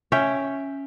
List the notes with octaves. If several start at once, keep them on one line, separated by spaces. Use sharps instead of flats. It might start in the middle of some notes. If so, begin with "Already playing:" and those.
C#4 C#5 E5 G5